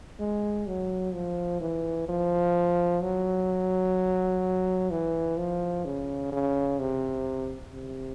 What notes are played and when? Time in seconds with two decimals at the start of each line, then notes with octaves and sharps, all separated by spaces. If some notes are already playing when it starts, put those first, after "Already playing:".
0.19 G#3
0.67 F#3
1.13 F3
1.60 E3
2.08 F3
3.02 F#3
4.91 E3
5.38 F3
5.85 C#3
6.32 C#3
6.79 C3
7.74 C3